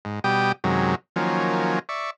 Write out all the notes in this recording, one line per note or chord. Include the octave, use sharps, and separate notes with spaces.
G#2
B2 G3 G4 G5 D#6
F#2 C3 D#3 F#3 G#3
D#3 F3 F#3 A#3 C#4
D5 E5 C#6